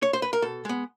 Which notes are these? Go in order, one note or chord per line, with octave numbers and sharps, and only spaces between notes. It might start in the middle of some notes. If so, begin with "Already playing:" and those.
C#5
C5
B4
A#4
B2 A4
G#3 B3